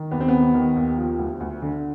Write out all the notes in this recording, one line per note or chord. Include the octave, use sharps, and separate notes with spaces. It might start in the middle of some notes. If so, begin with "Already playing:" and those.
Already playing: D#3
D#2 B3
C4
B3
D#3
D#3
D#2
F3
D2
D2
D3